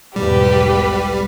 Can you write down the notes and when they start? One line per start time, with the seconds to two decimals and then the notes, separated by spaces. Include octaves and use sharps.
0.16 B1 E2 G#2 G3 G4 B4